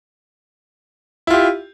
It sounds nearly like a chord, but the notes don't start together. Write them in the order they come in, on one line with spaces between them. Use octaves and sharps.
E4 F4 G4